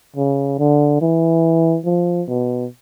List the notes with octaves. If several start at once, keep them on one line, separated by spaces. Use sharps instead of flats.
C#3
D3
E3
F3
B2